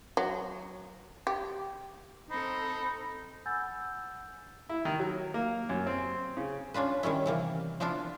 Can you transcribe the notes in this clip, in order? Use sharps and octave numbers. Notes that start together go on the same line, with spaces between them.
F#3
G4
C4 D#4 A4 B5
F#5 G#5 B5 E6 G6 A6
E4
D#3
F#3
A#3
F#2
C4
C#3
C#4 D4 F4 B4
D#3 G3 C#4 E4
C3 E3 A#3
F3 B3 D4 E4 F4